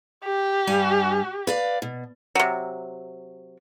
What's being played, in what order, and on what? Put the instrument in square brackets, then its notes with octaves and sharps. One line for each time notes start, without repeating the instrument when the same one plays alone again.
[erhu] G4
[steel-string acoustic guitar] G2 G3 G#5
B4 D5 F5
B2
[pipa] C3 F#3